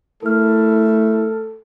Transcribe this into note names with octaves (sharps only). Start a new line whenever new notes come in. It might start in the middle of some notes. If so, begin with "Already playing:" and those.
A3 E4 A4 A#4 F6